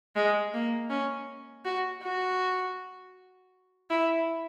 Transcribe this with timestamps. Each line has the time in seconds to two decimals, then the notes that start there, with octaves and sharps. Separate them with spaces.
0.16 G#3
0.54 A#3
0.90 C#4
1.65 F#4
2.02 F#4
3.90 E4